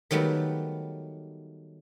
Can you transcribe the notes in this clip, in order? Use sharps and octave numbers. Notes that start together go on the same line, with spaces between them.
D#3 F#3 G3 A3 B3